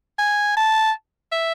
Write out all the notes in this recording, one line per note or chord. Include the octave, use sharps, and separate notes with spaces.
G#5
A5
E5